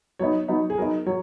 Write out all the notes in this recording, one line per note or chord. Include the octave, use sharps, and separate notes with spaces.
F#3 B3 D#4 C#5
F#3 B3 D#4
G#4
F#3 B3 D#4 A#4
F#3 C#5